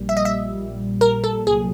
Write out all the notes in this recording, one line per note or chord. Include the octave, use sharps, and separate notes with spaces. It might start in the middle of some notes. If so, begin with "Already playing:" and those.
Already playing: A#1 A#2 G3
E5
D#5
E5
A#1 A#2 G3
A#4
A4
C2 A#2 F#3 G#4